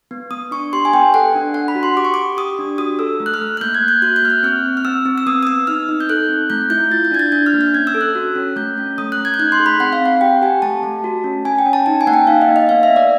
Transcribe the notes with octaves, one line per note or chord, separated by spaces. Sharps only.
B3
B3 D#6
D4 C#6
G4 C6
G#5
B3 G5
A4 F#5
D4
D4 F#5
B5
F#4
C6
G4 D6
C#6
G4 D6
G4 D#6
D4
F#4 D#6
A4 E6
A3
F#6
F6
A3
F#6
A#3 G6
G#6
A#3
G6
F#4 F#6
G6
A#3 F6
F#6
C4 F6
C4
F6
C4 E6
C4
E6
B3 D#6
D#6
B3 E6
D#4 F6
D#4
G6
A4 F#6
C4
A3 G6
E4 G6
F4 A6
G6
D4 G#6
A6
D4 G6
F6
A#3
G6
C#4 G#6
E6
A4
F#6
F#4
C#4
A3 G6
C#4
A3 D#6
F#6
A3
G#6
G6
D#4 F#6
C6
G#4
B5
C4 F#5
F5
C4 F#5
G4 G5
G4 G#5
A3 A5
A3
F#4
C#4
C#4 G#5
G5
C#4
A5
D#4 A5
G#5
A#3 F#5
G5
D#4 F5
D#5
A#3
D#5
B3 F5
E5
B3
D5